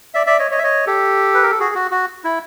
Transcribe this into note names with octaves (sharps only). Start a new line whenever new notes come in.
D5 E5
D5 E5
C#5 D#5
C#5 D#5
E5
C#5 D#5
G4 A4
B4
A#4
A4
F#4 G#4
F#4
F#4
E4